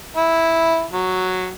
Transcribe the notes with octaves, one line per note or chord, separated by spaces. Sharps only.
E4
F#3